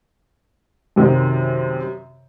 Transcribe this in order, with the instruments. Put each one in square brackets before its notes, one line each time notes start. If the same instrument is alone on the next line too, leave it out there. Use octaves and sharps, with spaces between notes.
[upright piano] F#2 C3 D#3